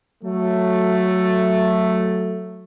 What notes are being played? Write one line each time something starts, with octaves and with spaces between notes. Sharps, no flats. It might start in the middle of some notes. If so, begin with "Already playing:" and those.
F#3 A3